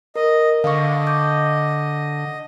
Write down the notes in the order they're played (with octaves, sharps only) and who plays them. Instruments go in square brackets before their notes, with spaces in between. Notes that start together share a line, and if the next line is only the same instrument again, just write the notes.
[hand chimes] A#4 [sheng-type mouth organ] D#5
[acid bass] D3 [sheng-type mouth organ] D#5 [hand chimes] F5 C#6
[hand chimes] D6 G6